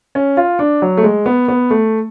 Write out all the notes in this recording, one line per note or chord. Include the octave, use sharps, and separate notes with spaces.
C#4
F4
D4
F#3
A3
G#3
B3
B3
A3